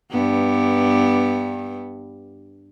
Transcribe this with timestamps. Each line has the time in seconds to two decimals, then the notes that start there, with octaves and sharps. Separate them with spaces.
0.11 G2 B3